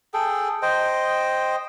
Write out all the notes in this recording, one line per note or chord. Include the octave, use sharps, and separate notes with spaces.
G#4 A4 G5
C5 D#5 G5